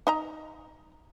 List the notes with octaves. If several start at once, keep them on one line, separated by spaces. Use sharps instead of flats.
D#4 D#5 A#5